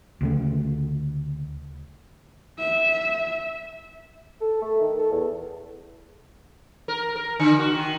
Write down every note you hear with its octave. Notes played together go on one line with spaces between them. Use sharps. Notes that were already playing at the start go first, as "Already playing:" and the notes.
D2 C#3 A3
E5
A4
A3
D#3
A4
E2
A#4
A#4
D3
F#4
D#3